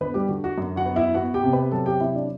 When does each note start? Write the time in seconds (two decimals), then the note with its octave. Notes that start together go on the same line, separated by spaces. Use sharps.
0.01 D3 B3 B4
0.14 G3 G4
0.29 D3 F#4
0.44 F#4
0.58 F#2
0.76 F#4 F#5
0.86 B3
0.96 E4 E5
1.14 B3 F#4 F#5
1.34 G4 G5
1.44 C3
1.53 B4 B5
1.72 F#3 A4 A5
1.86 G4 G5
2.00 C3 E4 E5
2.15 D4 D5